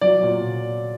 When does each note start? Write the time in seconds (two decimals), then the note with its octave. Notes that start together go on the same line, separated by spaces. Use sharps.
0.01 F#3 D5
0.23 A#2